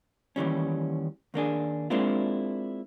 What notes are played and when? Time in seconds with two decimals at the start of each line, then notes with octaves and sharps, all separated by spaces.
0.36 D#2 E3 G3 C#4
1.34 D#2 A#3 D4 G#4
1.90 G#3 A#3 C4 D4 E4 F4